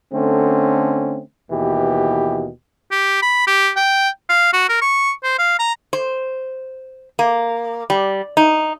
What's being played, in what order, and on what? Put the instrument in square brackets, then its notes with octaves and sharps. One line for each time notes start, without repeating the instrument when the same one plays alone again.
[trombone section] D3 A3 C4 C#4
D#2 B2 E3 G4
[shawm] G4
B5
G4
G5
F5
F#4
A#4
C#6
C5
F5
A#5
[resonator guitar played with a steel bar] C5
A#3
G3
D#4